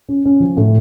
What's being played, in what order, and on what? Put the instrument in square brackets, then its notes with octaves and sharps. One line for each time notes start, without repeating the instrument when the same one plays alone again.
[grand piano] C#4
C#4
F3
A2